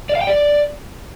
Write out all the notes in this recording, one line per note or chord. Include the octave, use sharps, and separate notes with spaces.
D5
F5
G5
D5